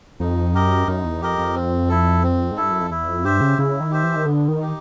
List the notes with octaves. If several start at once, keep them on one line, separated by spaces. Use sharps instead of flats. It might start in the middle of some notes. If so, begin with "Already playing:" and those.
F2 D#4
F#2 G4 A#4 D#5
F#2 D#4
E2
F2 G4 A#4 D#5
F2
C4
E4 A4
C4
G#2
G2 E4 A4
F#2
F2
E2 E4
F2
G2 G4 C5 E5
C#3
C#3 E4
D#3
G4 C5 E5
E3
D#3
D3 B3
D#3
D#4 G4